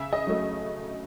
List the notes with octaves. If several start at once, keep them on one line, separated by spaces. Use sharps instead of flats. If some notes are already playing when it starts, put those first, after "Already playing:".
Already playing: C#3 E5
D#5
F#3 A3